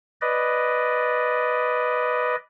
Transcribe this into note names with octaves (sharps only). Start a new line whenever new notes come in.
B4 D5 D#5